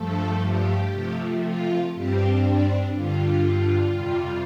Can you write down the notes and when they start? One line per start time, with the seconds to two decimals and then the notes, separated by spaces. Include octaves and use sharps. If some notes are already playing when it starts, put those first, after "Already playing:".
Already playing: G2 F3 A3 A4
0.43 G4
0.93 C3 F3 A3
1.43 F4
1.94 G2 G3 C4 G4
2.44 D4
2.95 G2 D3 G3 F4
3.95 F2 C3 G3